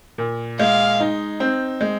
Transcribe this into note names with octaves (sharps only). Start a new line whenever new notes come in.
A#2
G#3 F5
D#4
C4
G#3